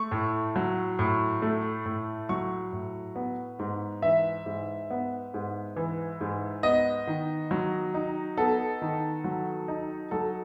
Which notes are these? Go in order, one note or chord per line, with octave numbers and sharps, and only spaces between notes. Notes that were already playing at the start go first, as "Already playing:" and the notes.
Already playing: A3 C#6
A2
F#3
A2
A3
A2
F#3 C#6
A2
B3
G#2
E3 E5
G#2
B3
G#2
E3
G#2
B3 D#5
D#3
F#3
D#4
B3 A4
D#3
F#3
D#4
F#3 A4